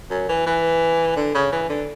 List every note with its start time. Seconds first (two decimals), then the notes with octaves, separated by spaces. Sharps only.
0.11 F#2
0.29 E3
0.46 E3
1.16 D3
1.34 C#3
1.52 E3
1.69 D3